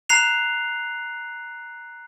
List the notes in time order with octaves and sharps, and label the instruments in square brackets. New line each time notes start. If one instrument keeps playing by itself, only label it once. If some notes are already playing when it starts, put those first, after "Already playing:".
[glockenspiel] A#5 F#6 C7 F7